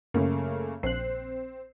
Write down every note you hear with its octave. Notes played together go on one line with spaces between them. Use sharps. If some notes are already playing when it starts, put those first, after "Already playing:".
F#2 C#3 A3 A#3
A#1 C4 F#6 C7